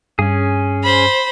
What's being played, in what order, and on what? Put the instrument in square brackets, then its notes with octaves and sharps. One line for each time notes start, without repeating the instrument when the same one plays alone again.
[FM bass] G2 [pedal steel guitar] C#4 G#4
[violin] C5 B5